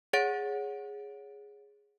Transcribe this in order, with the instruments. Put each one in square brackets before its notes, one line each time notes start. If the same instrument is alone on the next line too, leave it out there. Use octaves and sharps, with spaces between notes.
[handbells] G#4 C#5 F#5 A6 D7